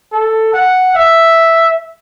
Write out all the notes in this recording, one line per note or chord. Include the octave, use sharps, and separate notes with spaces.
A4
F#5
E5